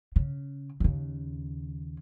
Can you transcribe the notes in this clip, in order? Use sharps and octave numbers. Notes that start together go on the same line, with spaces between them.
C#3
D#2 C#3